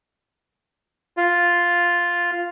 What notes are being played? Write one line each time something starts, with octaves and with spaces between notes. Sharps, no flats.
F4